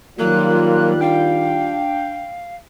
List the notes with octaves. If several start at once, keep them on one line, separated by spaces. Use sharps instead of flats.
D#3 F#3 G3 A#3 F4 F#6
D4 F5 G5